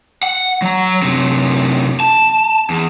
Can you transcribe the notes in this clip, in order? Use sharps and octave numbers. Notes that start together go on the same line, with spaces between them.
F#5
F#3 A#5
F#2 C3
A5
E2